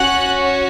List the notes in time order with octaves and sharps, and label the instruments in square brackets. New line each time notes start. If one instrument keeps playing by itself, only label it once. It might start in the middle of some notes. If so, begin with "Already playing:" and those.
Already playing: [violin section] C#4 F#4 F#5 F#6